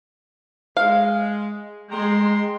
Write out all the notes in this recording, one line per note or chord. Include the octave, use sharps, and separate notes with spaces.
G#3 F5
G#3 G5 A#5 C6